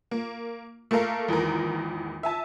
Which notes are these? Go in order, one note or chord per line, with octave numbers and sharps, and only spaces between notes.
A#3
A3 A#3 A4 A#4 F5
G#1 E2 A#2 A#4
E5 G#5 A5